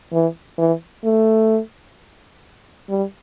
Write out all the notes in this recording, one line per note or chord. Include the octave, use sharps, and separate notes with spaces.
E3
E3
A3
G3